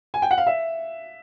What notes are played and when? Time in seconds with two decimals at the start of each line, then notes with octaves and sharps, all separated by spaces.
0.14 G#5
0.22 G5
0.31 F#5
0.38 F5
0.47 E5